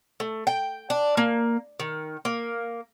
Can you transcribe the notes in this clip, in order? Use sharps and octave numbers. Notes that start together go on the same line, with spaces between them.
A3
G5
D4
A#3
D#3
A#3